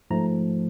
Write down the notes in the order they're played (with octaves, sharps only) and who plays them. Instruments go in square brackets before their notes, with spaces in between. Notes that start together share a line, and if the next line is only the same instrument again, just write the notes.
[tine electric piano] G#2 F3 A3 A#5